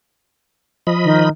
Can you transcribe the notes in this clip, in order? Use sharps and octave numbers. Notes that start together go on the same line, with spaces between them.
F3 D#5 B5
D#3